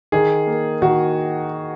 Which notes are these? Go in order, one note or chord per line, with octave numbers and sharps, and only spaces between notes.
D#3 G#4
A#3
D#3 F#4